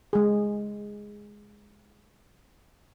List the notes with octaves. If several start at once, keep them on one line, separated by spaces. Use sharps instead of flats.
G#3 G#4